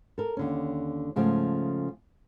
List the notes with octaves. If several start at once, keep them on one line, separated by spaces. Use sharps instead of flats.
A4 A#4
D#2 D3 C#4
G#2 C#3 F3 A3